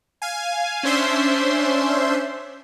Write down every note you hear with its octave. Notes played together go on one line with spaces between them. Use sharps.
F5 G#5
C#4 D4 C5 E5 C6